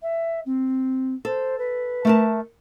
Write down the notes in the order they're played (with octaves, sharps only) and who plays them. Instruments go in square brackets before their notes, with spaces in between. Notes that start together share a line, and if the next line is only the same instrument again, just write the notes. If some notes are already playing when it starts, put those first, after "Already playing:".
[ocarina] E5
C4
[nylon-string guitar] A4 [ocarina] C5
[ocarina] B4
[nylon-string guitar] A3 A#4 A5